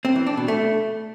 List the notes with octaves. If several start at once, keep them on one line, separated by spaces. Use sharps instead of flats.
C4
E3
D4
B2
A3